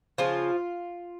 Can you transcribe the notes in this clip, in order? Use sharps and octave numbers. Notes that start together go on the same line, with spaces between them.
C#3 F3 F4